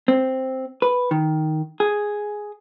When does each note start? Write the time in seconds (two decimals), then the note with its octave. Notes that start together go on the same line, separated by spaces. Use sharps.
0.08 C4
0.82 B4
1.11 D#3
1.80 G#4